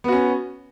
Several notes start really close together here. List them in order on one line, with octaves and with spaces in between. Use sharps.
B3 F#4 C#4